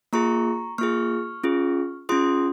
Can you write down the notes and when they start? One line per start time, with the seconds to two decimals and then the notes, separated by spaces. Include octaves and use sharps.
0.13 A#3 F4 G#4 A#5 C#6
0.78 A#3 F4 G#4 C#6 F6
1.44 C#4 F4 G#4
2.09 C#4 F4 G#4 C6 D#6